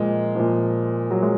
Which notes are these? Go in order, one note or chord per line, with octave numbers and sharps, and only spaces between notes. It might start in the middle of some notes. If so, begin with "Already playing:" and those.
Already playing: A#2 F3 G#3
A#2 F3
F#3
G#3